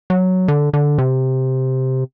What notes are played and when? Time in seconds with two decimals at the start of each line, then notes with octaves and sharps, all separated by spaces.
0.10 F#3
0.48 D3
0.74 D3
0.98 C3